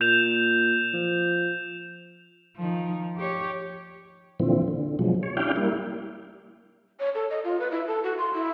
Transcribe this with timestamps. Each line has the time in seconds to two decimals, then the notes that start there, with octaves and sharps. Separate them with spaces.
0.01 A#2 G6 E7 F7
0.93 F3
2.57 D#3 F3
3.18 G4 C#5
4.40 A#2 D3 E3 F3 C4
4.68 D3
4.99 B2 F3 F#3 G#3
5.23 C#5
5.37 C#4 D4 E4 G4 F5 G5
5.56 G3 A#3 E4
7.00 C#5
7.15 A4
7.30 D#5
7.44 F4
7.59 B4
7.71 E4
7.87 A4
8.03 F#4
8.18 C6
8.34 E4